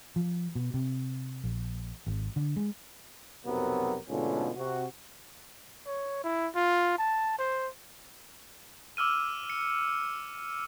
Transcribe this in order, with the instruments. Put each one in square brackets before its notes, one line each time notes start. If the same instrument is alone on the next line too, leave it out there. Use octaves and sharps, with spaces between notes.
[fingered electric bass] F3
B2
C3
A#1
G#1
D3
G#3
[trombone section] B1 F2 C3 F#3 B3 A#4
G#2 B2 D3 A3 C#4 F4
C3 F#4
[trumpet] C#5
E4
F4
A5
C5
[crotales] D6 E6 F6 D#7
C#7